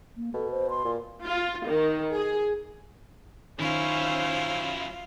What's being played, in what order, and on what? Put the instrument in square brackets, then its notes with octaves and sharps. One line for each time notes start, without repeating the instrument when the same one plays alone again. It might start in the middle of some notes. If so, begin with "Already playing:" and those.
[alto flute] A#3
[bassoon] B2 [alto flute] A4
[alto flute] C5
C6
[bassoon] A#2
[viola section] F4
D#3
G#4
[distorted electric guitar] F#2 E4 [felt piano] D#3 [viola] C#4 C5 [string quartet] F4